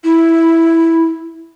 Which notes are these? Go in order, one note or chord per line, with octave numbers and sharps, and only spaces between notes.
E4